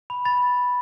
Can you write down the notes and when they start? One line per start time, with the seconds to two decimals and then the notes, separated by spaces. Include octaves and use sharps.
0.10 B5
0.25 B5 A6